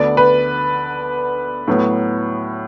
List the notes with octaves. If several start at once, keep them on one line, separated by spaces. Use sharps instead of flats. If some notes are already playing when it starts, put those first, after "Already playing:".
Already playing: D2 D3 B3 D5
B4
A2 F#3 B3